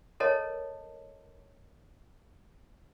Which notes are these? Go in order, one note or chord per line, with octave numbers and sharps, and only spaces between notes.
A4 A#4 C#5 D#5 A5